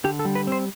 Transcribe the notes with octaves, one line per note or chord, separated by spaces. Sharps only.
D3 G4
A4
G3
B4
C4 C5